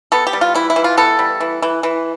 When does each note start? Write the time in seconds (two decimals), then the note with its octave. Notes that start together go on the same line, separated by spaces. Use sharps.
0.12 B3 A4
0.27 G4
0.33 G3
0.41 F4
0.55 E3 E4
0.70 E4
0.76 E3
0.84 F4
0.97 B3 A4
1.19 G3
1.40 E3
1.62 E3
1.83 E3